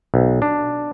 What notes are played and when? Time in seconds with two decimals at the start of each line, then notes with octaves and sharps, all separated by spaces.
0.14 B1
0.42 D4